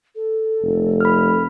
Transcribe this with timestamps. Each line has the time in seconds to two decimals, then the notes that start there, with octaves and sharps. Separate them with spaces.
0.16 A4
0.63 F1
1.00 B5 F6